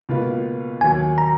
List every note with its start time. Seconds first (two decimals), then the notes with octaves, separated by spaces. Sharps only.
0.09 C#2 B2 A#3 F4 B4
0.81 D#2 D#3 F#3 A#3 G#5
1.18 A#5